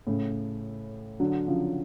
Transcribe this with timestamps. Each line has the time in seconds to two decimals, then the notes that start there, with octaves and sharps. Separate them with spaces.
0.07 A2 C#3
1.20 D3 F#3
1.48 C#3 F3